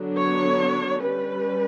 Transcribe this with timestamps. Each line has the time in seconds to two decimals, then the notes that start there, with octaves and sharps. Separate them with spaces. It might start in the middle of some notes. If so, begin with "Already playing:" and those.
Already playing: D3 F#3 B3 D4
0.17 C#5
1.02 G3 C#4 B4